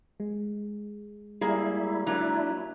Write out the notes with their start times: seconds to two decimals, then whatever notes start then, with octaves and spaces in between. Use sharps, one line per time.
0.20 G#3
1.41 G3 A#3 E4 G#4
2.07 F#3 A#3 D4 E4 A#5